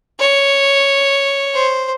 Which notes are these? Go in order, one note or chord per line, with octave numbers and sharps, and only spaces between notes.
C#5
C5